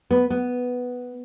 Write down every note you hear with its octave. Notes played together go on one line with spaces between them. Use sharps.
B3
B3